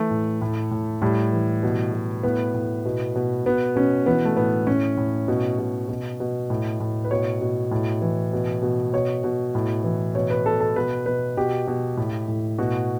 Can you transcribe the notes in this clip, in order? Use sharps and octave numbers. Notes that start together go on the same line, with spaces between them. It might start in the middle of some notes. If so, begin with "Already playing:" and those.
Already playing: E3 A3
A2
A2
A2
A2 G3
E3
B2
B2
A2 B3
A2
B2
B2
B2 B3
B2 C#4
E3 B3
A3
A2 B3
A2 C#4
A2
B2
B2
B2
B2
A2
A2
B4
B2 C#5
B2
A2
E3
B2
B2
B2 C#5
B2
A2
E3
B2 C#5
B4
B2 A4
A4
B2 B4
B2 B4
B2 G4
B2
A2
A2
B2 F#4